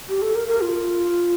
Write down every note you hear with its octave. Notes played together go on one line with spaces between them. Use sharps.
G4
A4
A#4
A#4
F4